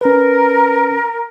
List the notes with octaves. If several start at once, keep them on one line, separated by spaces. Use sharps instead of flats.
C#4 A#4 B4